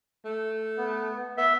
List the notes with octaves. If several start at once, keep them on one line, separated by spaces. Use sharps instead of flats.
A3
B3
B3 E5